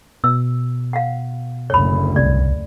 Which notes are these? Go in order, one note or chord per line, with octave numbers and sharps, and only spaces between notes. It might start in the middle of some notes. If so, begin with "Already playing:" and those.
B2 E6
F5 F#5
F#1 D2 C#5 B5
C2 D5